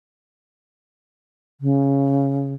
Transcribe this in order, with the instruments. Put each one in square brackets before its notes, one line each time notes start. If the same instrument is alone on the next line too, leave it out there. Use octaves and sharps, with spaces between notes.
[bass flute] C#3